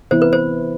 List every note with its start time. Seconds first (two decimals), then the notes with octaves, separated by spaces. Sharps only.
0.11 C3 E3 B3 E4 C5
0.22 B4
0.33 C5